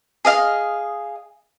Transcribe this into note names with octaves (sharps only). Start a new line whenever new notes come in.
G#4 D#5 F5